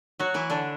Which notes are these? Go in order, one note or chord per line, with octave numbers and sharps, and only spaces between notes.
F#3 F#4
E3 E4
D3 D4